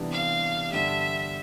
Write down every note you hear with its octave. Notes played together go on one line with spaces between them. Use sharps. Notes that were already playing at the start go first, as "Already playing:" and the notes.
Already playing: C3 E3 G3 B3 D4
F5
G2 D3 G3 E5